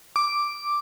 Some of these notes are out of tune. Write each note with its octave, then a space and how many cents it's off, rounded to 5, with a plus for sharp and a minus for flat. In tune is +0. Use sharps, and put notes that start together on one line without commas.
D6 +0